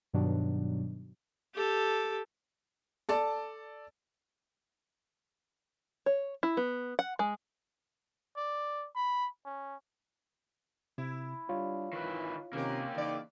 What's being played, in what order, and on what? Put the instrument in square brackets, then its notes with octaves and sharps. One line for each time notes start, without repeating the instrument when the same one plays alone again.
[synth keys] G2 B2 D#3 F#3 D4
[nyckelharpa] G4 A4
[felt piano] A4 D5 A5
[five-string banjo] C#5
E4
B3
F#5
G#3
[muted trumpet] D5
B5
C#4
[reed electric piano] C3 [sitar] E4
[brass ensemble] G3 D4 [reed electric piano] F4 C#5 F5
[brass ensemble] G#1 E3 [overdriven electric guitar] D#3 B4
[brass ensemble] C3 C#4 [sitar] D#3 A#4 [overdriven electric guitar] A#3 G4
[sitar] E2 D5 [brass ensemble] C#3 D#4